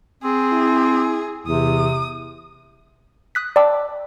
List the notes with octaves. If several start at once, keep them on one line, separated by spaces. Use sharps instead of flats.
C4 G#4
E4
E2 C3 D#6
D#6 F#6 B6
D5 G5 A5 B5 D6 E6